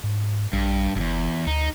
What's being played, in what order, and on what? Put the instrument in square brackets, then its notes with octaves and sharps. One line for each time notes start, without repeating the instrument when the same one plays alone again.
[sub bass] G#2
[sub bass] A#1 [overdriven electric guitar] G2
[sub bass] F#1 [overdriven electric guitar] E2 G2
[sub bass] D2 [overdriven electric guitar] D#4